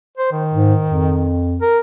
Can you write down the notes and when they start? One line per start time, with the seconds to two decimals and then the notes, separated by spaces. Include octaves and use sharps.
0.17 C5
0.32 D#3
0.54 G#2
0.85 F2
1.62 A#4